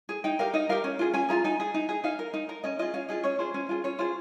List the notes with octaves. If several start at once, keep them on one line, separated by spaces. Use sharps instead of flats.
G#4
D#4 G5
G4 A#4 F5
D#4 D#5
G4 A#4 F5
C#4
F4 G#4
C#4 G#5
F4 G#4 A#5
D#4 G#5
G#4
D#4
G#4
D#4 F5
A#4
D#4
A#4
C#4 D#5
F4 G#4 D#5
C#4 F5
F4 G#4 D#5
C#4 C#5
F4 G#4 C5
C#4
F4 G#4
C#4 C#5
F4 G#4 C5